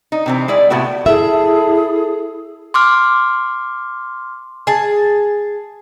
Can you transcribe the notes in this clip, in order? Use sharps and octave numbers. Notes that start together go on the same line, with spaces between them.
D#4
C3 E3 C4
G#3 E4 D5
A2 C3 B3 E4 F#4
E4 G#4 A4 E5
C6 D6 F6
G#4 A5